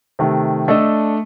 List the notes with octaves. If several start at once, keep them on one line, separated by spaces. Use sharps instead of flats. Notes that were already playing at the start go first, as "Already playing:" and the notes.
C3 D#3 A3
A3 D4 A4 D#5